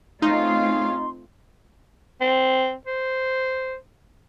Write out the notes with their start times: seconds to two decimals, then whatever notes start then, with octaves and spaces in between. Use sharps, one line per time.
0.22 A3 C4 C#4 D#4 F4 G#4 F5 C6
2.21 C4
2.87 C5